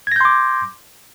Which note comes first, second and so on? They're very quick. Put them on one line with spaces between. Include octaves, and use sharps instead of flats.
G#6 A#6 G6 C6 D6